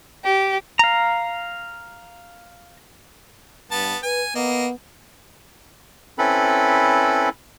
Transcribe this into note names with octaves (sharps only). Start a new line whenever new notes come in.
G4
F5 A#5
G2 B3 A5
B4 G#5
A#3 B3 D#5
C4 C#4 E4 A4 B4 B5